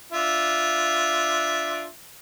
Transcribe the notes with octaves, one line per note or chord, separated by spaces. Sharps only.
D4 F4 E5